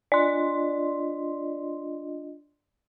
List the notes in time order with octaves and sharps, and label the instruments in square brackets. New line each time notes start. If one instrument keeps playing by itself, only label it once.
[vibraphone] D4 F4 D#5 [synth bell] D5 C6